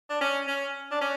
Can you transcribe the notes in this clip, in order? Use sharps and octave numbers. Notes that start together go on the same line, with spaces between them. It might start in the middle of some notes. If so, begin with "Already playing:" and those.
D4
C#4
C#4
D4
C#4